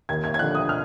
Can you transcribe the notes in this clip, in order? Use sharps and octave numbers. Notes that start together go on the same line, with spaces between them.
D#2 G#6
G#6
G#6
D3 F3 F#6
D#6
F6